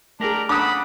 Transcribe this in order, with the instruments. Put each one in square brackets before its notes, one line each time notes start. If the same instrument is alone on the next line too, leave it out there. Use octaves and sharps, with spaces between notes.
[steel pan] A3 G#4 [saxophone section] D4 G4 A#4
[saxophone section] C#3 A4 F#5 [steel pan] D4 A5 [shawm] B5 [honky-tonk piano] D6 D#6